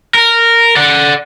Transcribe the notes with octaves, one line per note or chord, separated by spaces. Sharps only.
A#4
D5 F#5